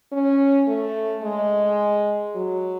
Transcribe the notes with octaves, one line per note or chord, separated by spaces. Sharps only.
C#4
A3
G#3
F#3